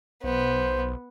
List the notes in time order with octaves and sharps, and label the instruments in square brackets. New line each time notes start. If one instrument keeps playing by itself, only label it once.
[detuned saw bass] B1 [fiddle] B3 [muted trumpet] C5